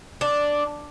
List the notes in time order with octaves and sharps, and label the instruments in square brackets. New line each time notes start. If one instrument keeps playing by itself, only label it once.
[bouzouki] D4